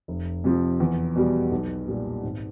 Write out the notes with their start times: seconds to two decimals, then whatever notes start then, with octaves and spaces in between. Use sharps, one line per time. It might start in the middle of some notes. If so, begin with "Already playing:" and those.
0.08 F1
0.44 F2 C3 F3
0.80 E2
1.16 B2 G3
1.51 B1
1.88 A#2 G3
2.23 G#1